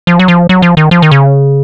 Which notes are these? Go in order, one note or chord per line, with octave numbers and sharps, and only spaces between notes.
F3
F#3
F3
F#3
F3
D#3
F3
D#3
C#3